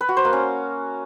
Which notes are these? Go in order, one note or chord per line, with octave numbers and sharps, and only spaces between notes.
B4
F#4
C5
A#3
C#4